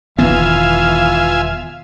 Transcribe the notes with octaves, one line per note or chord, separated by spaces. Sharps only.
E1 D#3 E3 B3 F4 E5 F5 G#5